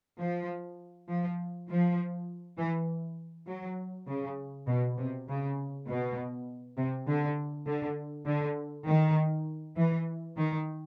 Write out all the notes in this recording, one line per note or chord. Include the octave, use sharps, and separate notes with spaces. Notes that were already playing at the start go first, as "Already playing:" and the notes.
F3
F3
F3
E3
F#3
C#3
B2
C3
C#3
B2
C3
D3
D3
D3
D#3
E3
D#3